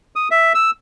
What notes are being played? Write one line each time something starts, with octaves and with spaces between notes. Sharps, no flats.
D#6
E5
E6